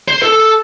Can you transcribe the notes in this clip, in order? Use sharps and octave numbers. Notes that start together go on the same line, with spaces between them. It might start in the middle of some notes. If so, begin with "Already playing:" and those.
C5
A4